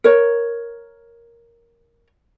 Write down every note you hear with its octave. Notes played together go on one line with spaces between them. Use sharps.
A#4 C#5